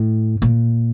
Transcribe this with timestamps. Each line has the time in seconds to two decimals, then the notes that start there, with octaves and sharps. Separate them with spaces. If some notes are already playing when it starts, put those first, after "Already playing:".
Already playing: A2
0.42 A#2